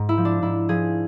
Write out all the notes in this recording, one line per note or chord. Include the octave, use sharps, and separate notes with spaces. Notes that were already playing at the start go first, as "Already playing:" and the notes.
Already playing: G#2
E4
F3
D4
G#2 E4
F3 G#4